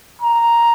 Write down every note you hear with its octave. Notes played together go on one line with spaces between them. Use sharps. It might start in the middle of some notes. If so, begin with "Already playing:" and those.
A#5